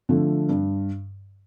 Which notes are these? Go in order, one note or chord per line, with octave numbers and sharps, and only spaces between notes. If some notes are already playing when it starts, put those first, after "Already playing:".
D3 F3 A3
G2